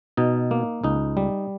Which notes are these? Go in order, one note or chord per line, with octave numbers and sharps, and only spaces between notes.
B2 D#4
A#3
C#2 D#4
G3